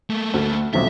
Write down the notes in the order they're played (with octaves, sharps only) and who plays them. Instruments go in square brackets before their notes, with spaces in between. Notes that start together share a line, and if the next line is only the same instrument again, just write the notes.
[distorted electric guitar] A3 A#3
[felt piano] D2
[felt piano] D#1 B1 C4 [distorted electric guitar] E5